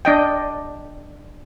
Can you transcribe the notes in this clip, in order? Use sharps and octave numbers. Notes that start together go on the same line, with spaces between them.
D4 D#5 G5